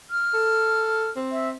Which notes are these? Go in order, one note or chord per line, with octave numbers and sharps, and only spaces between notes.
F6
A4
C4
E5